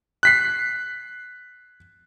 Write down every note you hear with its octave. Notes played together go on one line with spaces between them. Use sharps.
F#6 B6 C7